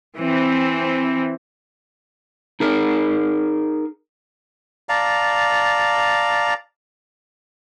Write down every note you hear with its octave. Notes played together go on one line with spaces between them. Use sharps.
E3 C4
D#4 G#4 A#4
D5 F5 A5 A#5